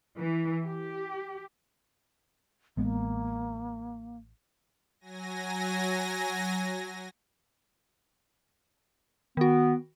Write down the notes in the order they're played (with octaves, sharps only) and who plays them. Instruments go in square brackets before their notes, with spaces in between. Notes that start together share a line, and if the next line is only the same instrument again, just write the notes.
[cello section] E3
G4
[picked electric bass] A1 G#3 B3 [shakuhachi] A#3
[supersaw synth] F#3 G#5 A#6
[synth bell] D#3 F#4 [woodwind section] B3